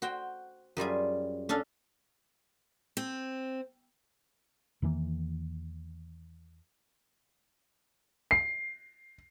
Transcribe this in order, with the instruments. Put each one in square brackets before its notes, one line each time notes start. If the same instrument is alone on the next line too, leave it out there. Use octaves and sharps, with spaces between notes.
[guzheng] F#4 C5 G5
F#2 G3 F4 G#4
C#4 D4 A4 F5
[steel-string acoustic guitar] C4
[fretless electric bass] E2 D#3 E3 A#3
[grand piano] C7